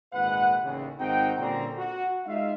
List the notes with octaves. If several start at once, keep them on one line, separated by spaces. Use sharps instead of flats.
G#1 A#2 G#3 B4 F#5
A1 D#2 C#3
G#1 C4 D#4 F#4 G5
A#2 D3 G3 C4 C#4 A#5
F#4
G#3 D#4 F4 E5 F5